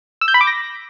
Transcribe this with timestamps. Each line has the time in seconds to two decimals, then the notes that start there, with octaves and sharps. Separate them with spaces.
0.21 E6
0.28 G6
0.34 B5
0.41 D6
0.47 A#6